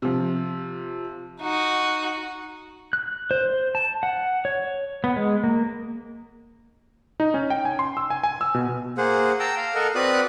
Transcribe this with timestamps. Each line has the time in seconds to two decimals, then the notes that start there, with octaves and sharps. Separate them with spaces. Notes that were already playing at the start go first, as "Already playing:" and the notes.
0.02 C3 F3
1.41 D#4 F#4
2.93 F#6
3.31 C5
3.75 A5
4.03 F#5
4.45 C#5
5.04 B3
5.16 G#3
5.44 A#3
7.20 D#4
7.34 C#4
7.50 G5
7.65 G#5
7.79 C6
7.97 E6
8.10 G#5
8.23 G#5
8.41 E6
8.54 B2
8.97 A#3 G#4 C5 F#5
9.40 G5 A5 A#5 E6
9.57 F5
9.75 A4 A#4 D#5 F#5
9.95 C4 F#4 B4 D5 D#6 F#6